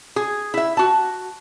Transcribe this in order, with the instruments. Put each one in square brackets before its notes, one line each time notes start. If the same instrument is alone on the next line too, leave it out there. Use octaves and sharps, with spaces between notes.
[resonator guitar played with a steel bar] G#4
E4 E5
F#4 A5